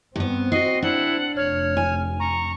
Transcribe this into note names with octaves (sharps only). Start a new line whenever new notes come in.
G2 B3 C4
F#4 D#5 C7
D4 E4 F#5
F1 C#5 F6
G#5
A#5 C#6